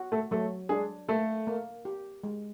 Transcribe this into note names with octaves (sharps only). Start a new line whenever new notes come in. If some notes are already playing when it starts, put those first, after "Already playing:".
Already playing: F#4
A3 A4
F#3 A3 A4
G#3 D4 G#4
A3 A#3 A4
A#3
G4
G#3